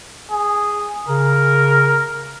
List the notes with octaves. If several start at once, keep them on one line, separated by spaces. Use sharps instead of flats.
G#4
C#3 A#4